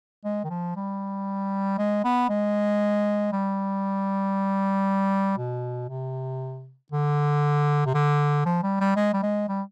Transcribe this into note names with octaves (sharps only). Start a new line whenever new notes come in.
G#3
D#3
F3
G3
G#3
B3
G#3
G3
B2
C3
D3
C3
D3
F3
G3
G3
G#3
G3
G#3
G3